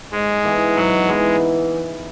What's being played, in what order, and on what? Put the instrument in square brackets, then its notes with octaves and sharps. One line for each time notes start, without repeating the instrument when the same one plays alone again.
[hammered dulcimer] G#2 [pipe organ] G#3
[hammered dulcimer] E3 B3
[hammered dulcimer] G#2 [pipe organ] F#3
[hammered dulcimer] E3 B3 [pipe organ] G#3